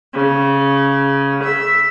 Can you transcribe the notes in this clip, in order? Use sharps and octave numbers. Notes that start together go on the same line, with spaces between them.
C#3
E5